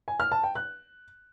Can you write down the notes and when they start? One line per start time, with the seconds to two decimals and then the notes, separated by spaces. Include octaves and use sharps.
0.08 G#5
0.20 F6
0.32 A5
0.44 G5
0.55 F#6